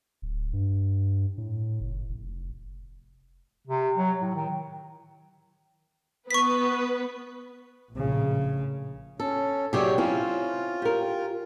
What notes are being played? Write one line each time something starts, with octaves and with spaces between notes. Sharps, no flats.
D1
G2
A2
F#1
F1
C3
F#3
A2
D#3
B3 B4 C#6 B6
A#1 A2 C#3
C#4 A4
C3 F#3 G4 G#4 C#5 D5
C4 C#4 E4 F4
G4 A#4